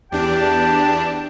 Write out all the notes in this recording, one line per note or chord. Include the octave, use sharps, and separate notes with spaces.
E2 D4 G4 G5 A5